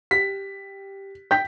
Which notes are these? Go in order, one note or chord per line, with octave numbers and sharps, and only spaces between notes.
G4 B6
G5 G6 B6